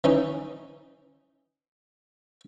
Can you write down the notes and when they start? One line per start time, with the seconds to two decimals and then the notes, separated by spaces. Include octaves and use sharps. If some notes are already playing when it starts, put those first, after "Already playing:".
0.04 E3 C#4 D#4